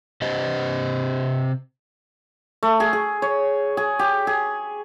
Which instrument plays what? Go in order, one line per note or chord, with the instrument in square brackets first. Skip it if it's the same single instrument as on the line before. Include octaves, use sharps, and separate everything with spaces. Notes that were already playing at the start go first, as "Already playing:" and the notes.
[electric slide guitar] C3 G4 C5 D#5
[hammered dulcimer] A3
G#4
G#4
C#5
G#4
G4
G#4